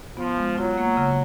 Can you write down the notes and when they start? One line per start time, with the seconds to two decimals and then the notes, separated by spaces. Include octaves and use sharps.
0.17 F3 B3
0.38 G#3
0.57 F#3 F4
0.78 A#3
0.97 C#3